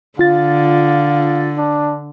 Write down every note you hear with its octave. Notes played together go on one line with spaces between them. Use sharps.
D3 F4 F5 A6
D4